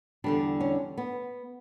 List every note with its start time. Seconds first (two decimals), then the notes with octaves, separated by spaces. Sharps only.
0.24 E2 D3 G3 D4
0.60 C#4
0.98 B3